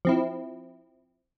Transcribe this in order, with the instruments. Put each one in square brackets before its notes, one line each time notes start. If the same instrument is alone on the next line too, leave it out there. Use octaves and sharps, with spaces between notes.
[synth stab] F3 C4 E4